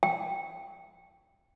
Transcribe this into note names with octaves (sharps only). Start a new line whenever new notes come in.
G5